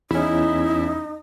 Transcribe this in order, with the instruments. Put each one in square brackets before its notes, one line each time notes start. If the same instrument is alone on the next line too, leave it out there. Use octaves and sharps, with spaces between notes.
[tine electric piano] E2 C#4 [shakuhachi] D#4 [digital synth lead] E4